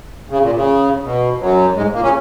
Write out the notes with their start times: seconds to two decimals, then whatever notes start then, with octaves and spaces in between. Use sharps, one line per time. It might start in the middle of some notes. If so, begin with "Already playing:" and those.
0.30 C#3
0.42 A#2
0.55 C#3
1.04 B2
1.40 F#2 F#3
1.76 G#2 G#3
1.94 A#2 A#3
2.03 C#3 C#4